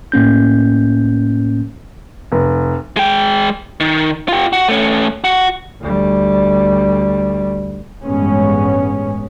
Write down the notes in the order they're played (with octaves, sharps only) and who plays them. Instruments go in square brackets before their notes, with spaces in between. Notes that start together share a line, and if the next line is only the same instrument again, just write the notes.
[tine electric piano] A2 A#3 C#4 G6
[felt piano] F1
[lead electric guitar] G#3 G5
D#3
F4 G4
F#4
A3 C#4
F#4
[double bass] D2 G3
[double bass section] A1 G2 G#3 B3 C#4